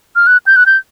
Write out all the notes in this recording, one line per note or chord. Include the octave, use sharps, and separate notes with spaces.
F6
F#6
G6
F#6
G6